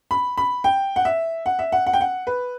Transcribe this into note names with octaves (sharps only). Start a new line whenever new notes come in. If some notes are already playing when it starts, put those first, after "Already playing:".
B5
B5
G5
F#5
E5
F#5
E5
F#5
F#5
G5
F#5
B4